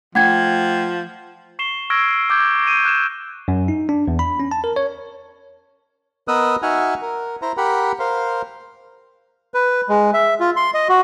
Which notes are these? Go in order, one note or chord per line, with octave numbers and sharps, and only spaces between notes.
F3 A3 F#5 G5 G#6
C#6 C7 E7 G7
C#6 E6 F6 G#6 A#6 D7
D6 G6 G#6 A#6
A#6 D#7
F#6 G#6 E7
F#2
D#4
D4
E2
B5
C#4
A5
A#4
C#5
B3 A#4 D#5 D#6 E6 F#6
D#4 F#4 E5 F#5 G#5 F6
A#4
E4 C5 A#5
G4 A#4 F#5 B5
A#4 C5 F5
B4
G#3
E5
F4
C6
D#5
F#4